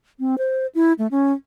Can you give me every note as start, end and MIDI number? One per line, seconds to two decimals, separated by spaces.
0.20 0.35 60
0.38 0.67 72
0.75 0.93 64
0.99 1.07 57
1.11 1.32 61